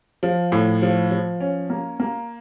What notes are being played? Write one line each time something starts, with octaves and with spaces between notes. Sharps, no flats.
F3
A2
F3
F3
C#4
A#3
A#3